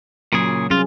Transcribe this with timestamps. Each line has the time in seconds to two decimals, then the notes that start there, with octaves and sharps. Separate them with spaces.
0.32 A#2 C#3 F#3 G#4
0.70 C2 F#3 C#4 F4 G#4